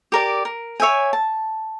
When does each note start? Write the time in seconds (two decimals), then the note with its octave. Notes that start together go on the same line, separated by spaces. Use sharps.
0.12 G4 A#4 D5
0.45 A#4
0.80 C#5 E5 G5 G#5
1.13 A5